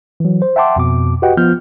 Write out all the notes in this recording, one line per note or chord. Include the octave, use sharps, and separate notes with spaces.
E3 F#3
C5
E5 F#5 G5 A5 C6 D6
F2 B2 D6
F#4 G4 B4 D#5 F#5 G5
F3 B3 F4 F6 G6